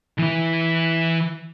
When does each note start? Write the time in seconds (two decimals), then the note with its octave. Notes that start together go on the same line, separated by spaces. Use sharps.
0.19 E3 E4